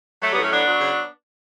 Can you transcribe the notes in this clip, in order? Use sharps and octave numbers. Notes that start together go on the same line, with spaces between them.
F#3 A3
G3 B3
A2
A3 C#4
F#3 B3 D4
F#3
C#3